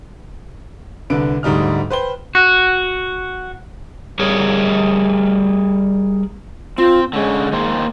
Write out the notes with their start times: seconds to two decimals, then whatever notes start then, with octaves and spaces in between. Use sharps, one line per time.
1.10 C2 D3 B4 D7
1.43 D2 G#2 G3 D#4 F6
1.90 B4 C5 G5 G7
2.35 F#4
4.19 G3 G#4 A#4 C#5
6.78 C4 F4
7.13 D3 G#3 C#4
7.52 D#3 A#3 C5